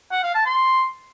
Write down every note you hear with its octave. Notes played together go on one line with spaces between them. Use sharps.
F#5
F5
A5
C6